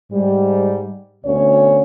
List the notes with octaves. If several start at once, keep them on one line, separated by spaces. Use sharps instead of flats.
G#2 G3
D2 B2 C#4 C#5